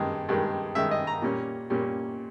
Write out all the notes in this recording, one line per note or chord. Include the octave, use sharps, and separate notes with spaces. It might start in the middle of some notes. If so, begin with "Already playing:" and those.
Already playing: G2 D#3 G#3
G2 D#3 G#3
G2 D#3 G#3 E5
D#5
A#5
A#2 G3 C#4
A#2 G3 C#4